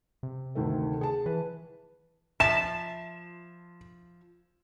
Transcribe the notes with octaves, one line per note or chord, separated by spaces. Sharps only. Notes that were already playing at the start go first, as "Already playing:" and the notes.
C3
D2 D#3 A3
G#4 A5
E3 B4
F3 E5 A5 E7